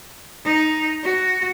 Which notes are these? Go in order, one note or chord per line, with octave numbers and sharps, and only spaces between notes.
D#4
F#4